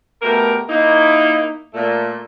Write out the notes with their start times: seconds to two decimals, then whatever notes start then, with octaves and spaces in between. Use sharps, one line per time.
0.22 B2 A3 G4 A#4
0.69 A#3 D#4 E4
1.74 A#2 A3